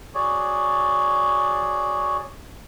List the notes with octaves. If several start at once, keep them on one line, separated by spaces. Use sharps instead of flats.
F#4 G#4 C#5 D5